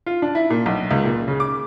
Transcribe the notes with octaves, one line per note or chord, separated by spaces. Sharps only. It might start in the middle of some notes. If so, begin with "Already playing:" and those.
F4
D4
E4
A#2
B1
C#2
A#2
C#3
D6